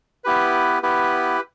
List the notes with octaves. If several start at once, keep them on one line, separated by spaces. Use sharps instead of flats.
B3 E4 G4 B4
B3 E4 G4 B4